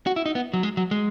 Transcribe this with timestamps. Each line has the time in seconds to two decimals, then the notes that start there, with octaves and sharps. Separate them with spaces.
0.06 F#4
0.16 E4
0.26 D#4
0.35 B3
0.53 F#3
0.63 G#3
0.77 F#3
0.91 G#3